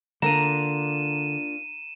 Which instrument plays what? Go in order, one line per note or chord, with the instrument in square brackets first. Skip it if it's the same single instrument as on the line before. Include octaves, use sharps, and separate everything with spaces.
[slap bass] D3 [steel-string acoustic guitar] A#3 D4 F4 [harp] A#5 [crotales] D#7 E7